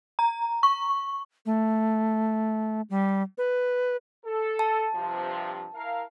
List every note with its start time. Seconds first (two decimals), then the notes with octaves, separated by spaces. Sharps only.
0.19 A#5
0.63 C#6
1.46 A3
2.90 G3
3.38 B4
4.25 A4
4.59 A5
4.95 G2 C3 F3
5.74 E4 A#4 F5